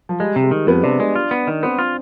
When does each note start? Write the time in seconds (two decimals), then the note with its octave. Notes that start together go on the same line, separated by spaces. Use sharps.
0.09 F3
0.20 G3 G#3
0.36 C3
0.43 G#3
0.51 D#3
0.67 F2 B3
0.83 C3 D4
0.99 G#3 D4
1.16 F4
1.31 B3
1.47 D#3
1.63 B3 C4
1.79 F4